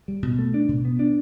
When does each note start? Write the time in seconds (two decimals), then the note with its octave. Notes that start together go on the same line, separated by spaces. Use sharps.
0.08 G3
0.23 B2
0.38 A3
0.54 D4
0.69 B2
0.85 B3
0.99 D4